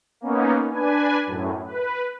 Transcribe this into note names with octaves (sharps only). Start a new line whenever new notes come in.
A#3 B3 C#4 D#4
D4 B4 G#5
F#2 A2
B4